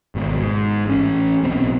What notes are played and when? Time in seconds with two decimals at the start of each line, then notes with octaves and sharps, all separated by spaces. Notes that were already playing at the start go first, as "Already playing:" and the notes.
0.15 G#1 B2
0.39 G#2
0.86 A1 C#4
1.43 B1 B2 B3 C4